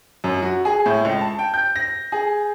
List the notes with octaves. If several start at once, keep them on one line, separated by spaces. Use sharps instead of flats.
F#2
F#4
G#4
A2
C#2
A5
G5
G6
A#6
G#4